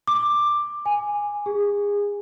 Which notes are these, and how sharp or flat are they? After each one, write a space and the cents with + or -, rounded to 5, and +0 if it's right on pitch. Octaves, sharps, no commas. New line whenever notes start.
D6 +10
G#5 -10
G#4 -30